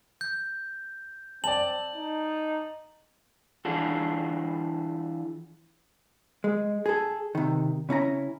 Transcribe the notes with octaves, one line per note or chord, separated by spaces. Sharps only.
G6
C4 D5 A5 F#7
D#4
E3 D4 F4 F#4 G#4 A4
G#3
G#4 A4
C3 D#3
C#3 C#4 E4 A#5